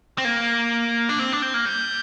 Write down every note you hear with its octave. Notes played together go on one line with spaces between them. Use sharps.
C4
A#3
D4
C4
D4
C4
A#3
G3